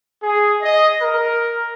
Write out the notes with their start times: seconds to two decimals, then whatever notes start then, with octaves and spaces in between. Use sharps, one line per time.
0.22 G#4
0.61 D#5
1.01 A#4